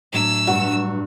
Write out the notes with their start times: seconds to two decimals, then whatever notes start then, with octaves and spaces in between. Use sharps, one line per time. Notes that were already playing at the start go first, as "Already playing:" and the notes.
0.13 A2 F#3 D4 E6
0.47 G2 F#4